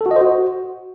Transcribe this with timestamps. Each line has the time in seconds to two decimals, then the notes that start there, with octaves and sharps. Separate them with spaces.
0.01 A4
0.06 F#4
0.11 D#5
0.16 C5
0.21 F#4